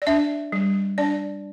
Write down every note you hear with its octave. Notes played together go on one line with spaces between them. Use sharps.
D5
D4 E5
G3
D4 D5